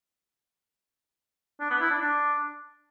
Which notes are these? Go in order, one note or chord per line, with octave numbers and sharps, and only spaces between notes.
D4
B3
E4
D4
D4